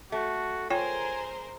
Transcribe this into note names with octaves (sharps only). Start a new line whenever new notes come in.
A3 F#4
F4 G#4 A#4 C5 C#5 G5 G#5